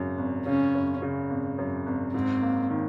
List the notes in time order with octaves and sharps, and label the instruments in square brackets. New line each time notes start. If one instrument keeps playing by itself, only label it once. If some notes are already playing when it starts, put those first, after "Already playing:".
Already playing: [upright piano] G#1 F#2 C#3
G#1
[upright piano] C#3 [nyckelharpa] C#4
[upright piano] F#2
C#3
G#1
F#2
G#1
[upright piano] G#2 [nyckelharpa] C4
[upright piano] A#3
D#3